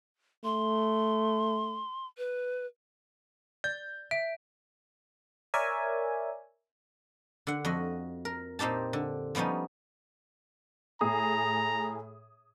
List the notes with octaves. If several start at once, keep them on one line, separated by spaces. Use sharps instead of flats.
A3 C6
B4
D5 G6
E5 D7
A#4 C#5 D5 E5 G#5
D3 F#5
F2 F#4 D#5
A#4
A#2 C4 D#4 G4 A5
D3
F3 G3 B3 C#4 D#4
A2 G#4 A#5 D#6